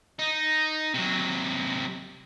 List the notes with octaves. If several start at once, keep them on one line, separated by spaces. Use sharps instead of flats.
D#4
C3 F#3